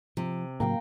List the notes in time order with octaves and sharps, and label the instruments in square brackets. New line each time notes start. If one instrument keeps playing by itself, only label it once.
[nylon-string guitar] C3 [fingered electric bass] F3
[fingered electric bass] A2 C#3 F#3 [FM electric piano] A#3 [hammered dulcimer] F5 G5 A#5